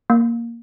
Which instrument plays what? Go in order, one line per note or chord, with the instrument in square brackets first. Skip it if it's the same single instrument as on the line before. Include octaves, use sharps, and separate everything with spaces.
[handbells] A#3